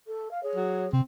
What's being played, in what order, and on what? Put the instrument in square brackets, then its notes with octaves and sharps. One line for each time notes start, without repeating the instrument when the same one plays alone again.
[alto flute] A4
F5
[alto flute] G#4 [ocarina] C#5
[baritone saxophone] F#3
[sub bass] C3 [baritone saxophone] C4